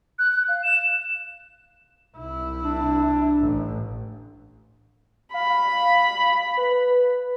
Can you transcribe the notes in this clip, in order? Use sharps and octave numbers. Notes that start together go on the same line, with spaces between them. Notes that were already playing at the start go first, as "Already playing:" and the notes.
F#6
F#6
F5
E7
C2 E4
D4
A1
F5 B5
B4